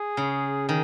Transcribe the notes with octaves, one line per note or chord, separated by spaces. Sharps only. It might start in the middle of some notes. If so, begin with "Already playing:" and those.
Already playing: G#4
C#3
D#3 G#4